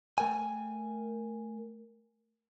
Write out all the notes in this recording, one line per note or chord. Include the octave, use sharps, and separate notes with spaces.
A3 A#4 G5 G#5